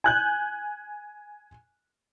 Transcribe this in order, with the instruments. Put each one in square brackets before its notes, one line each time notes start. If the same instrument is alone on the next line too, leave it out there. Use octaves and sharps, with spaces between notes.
[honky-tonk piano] G#5 F#6 G6